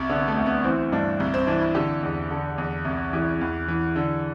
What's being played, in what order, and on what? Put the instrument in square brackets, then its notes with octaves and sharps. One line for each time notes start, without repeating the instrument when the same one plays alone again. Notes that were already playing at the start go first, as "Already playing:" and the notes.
Already playing: [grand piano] C2
D3 B3
A3
D2
B3
E3 C4
G2 D4
C2
C4
E3 D4
E4
D3 G4
E2
D3
E2
C2
E3 G4
E2
E3
D3